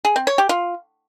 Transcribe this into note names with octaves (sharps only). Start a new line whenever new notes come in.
G#4
C4
C#5
G4
F4